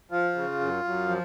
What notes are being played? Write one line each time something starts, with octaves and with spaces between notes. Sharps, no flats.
F3 F4
C#3
F#2
F#2
F3